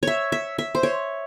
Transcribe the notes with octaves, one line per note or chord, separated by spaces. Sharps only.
C#5 E5
E5
E5
C5
C#5